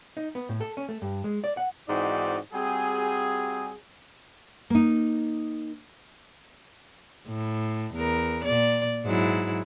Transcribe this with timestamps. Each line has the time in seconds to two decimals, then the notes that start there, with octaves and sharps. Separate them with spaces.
0.17 D#4
0.35 B3
0.49 A2
0.61 A4
0.77 C#4
0.89 A3
1.02 G2
1.24 G#3
1.44 D5
1.57 F#5
1.89 G#2 E3 C4 D#4 F#4 D5
2.53 G3 C4 F#4 G#4
4.70 A#3 D#4
7.28 A2
7.94 E2 A#4
8.44 A#2 D5
9.05 G#2 F#3 E4